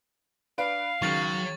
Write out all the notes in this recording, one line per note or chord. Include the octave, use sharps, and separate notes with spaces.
D4 B4 F5 D7
C#2 D#3 F#3 C#6 A6